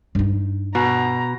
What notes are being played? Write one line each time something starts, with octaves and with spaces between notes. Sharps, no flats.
G2 D#4
B2 A#5